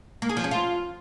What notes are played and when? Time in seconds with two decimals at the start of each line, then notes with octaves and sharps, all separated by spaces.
0.22 A#3
0.29 G#4
0.37 F3
0.44 C#4
0.51 F4